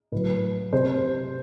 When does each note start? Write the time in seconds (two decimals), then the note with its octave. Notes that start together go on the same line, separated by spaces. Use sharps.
0.12 A2 F#3 B4
0.72 C3 C5